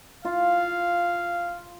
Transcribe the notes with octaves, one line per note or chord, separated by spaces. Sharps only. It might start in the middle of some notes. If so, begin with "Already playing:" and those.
F4 F5